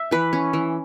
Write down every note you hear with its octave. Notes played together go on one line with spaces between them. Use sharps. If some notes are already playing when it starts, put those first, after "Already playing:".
Already playing: E5
E3 B4
C#4
E3